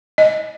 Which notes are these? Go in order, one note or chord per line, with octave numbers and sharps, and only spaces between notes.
D#5